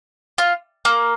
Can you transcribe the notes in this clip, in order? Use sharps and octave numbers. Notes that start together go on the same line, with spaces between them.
F4
A#3